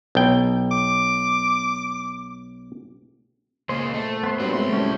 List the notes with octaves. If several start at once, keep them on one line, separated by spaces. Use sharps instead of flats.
B1 G5
D6
A#2 C#3 G#3 C5
A3
B3 C5
F#3 G3 C4 D4 B4
C2 A2 F#3 G#3 C6
A3 C#4 G4